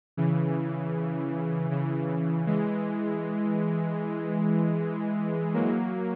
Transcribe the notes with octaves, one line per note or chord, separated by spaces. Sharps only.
C#3 E3
C#3 E3
E3 G#3
F#3 A#3